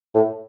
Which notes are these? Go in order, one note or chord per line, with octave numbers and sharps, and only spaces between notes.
A2